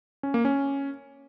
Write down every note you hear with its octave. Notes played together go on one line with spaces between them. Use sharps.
C#4
A#3
C#4